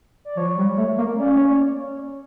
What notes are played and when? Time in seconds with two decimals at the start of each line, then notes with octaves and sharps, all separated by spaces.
0.25 D5
0.37 F3 C#5
0.58 G3
0.77 A3
0.98 A#3
1.17 C#4 D5
1.33 D5
1.38 C#5